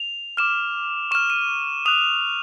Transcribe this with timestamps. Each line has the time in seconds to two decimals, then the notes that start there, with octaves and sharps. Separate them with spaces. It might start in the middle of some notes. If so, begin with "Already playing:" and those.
Already playing: F7
0.37 D6 F6 E7
1.11 C#6 F6 E7
1.30 D#7
1.86 D#6 F#6 F7